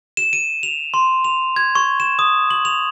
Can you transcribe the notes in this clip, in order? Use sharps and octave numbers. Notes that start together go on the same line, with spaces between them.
E7
D#7
F7
C6
F7
G#6
C#6
E7
D#6
F#7
F7